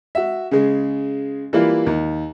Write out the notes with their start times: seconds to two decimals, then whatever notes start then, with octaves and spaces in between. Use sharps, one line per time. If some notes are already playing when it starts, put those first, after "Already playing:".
0.15 F#4 E5
0.51 C#3 G#3
1.53 E3 G3 A#3 E4 F4
1.87 D#2